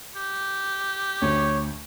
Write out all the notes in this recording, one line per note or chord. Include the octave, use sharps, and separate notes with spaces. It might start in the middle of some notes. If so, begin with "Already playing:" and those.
G4
D2 C#5